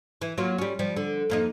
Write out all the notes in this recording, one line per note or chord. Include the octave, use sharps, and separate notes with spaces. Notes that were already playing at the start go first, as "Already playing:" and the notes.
E3
F#3 A#3 F4
G3 C#4
F3 G3
D3
F2 A#3 D#4